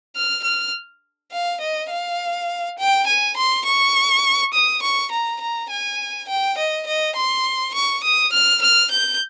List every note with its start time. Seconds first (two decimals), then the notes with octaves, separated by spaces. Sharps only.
0.16 F6
0.44 F6
1.32 F5
1.60 D#5
1.90 F5
2.78 G5
3.07 G#5
3.37 C6
3.65 C#6
4.53 D#6
4.82 C#6
5.11 A#5
5.41 A#5
5.70 G#5
6.28 G5
6.57 D#5
6.87 D#5
7.16 C6
7.74 C#6
8.03 D#6
8.33 F6
8.61 F6
8.91 G6